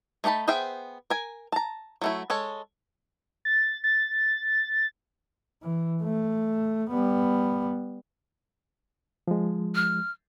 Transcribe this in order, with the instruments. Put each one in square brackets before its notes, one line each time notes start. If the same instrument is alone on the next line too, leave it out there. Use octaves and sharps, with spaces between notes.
[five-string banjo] A3 D#4 D5 A5 B5
B3 G#4 C5 E5 G5
A#4 G#5
A5 A#5
F#3 A3 E4
G#3 A4 C#5
[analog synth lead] A6
A6
[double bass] E3
A3
G3 B3
[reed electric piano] F3 G#3
[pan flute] F6